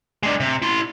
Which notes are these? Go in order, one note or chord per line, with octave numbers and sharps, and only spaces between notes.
G#3 D4
C3
E4 C6